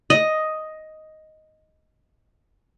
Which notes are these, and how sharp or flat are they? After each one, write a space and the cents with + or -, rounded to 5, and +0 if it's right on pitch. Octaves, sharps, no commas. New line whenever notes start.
D#5 +5